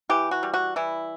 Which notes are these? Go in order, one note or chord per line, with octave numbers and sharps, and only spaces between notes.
E3 G4
F#4
G3
F#4
E3 E4